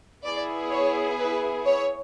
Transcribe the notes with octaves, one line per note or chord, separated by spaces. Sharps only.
B3 E4 G#4 D5
C#5
B4
C#5